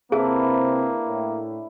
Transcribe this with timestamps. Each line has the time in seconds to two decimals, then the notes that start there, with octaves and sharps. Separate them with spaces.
0.12 C3 A#3 C4 D4 E4 G#4 B4
1.07 A2